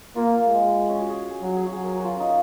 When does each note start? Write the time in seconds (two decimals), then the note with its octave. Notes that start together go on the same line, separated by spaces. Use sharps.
0.16 A#3 F4
0.48 G#3
0.89 C#4
1.00 F#4
1.10 G#4
1.31 G#4
1.42 F#3 F#4
1.56 G#4
1.67 F#4
1.73 F#3 G#4
1.83 A#4
2.00 F4 F#4
2.15 C#4
2.20 D#4